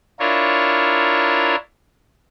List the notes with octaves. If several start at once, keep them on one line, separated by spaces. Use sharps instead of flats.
D4 E4 F4 A#4 C#5